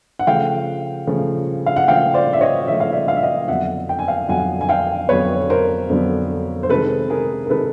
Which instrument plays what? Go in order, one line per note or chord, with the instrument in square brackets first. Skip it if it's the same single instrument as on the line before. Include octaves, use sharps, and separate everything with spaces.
[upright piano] F#5
C#3 F3 A3 F5 G5
C#3 F3 A3
F5
F#5
C#3 F3 A3 F5 G5
C5 D5
E5
C#5 D#5
C#3 F3 A3 E5
F5
D5 E5
F5
E5
D#5 F5
F2 D3 F#3 B3 E5 F#5
G5
G#5
F5 G5
F2 D3 F#3 B3 F#5 G#5
G#5
F5 G5
F2 D3 F#3 B3 B4 C#5
A#4 C5
F2 D3 F#3 B3
C5
C3 D#3 G#3 A4 B4
G#4 A#4
A#4
C3 D#3 G#3 A4 B4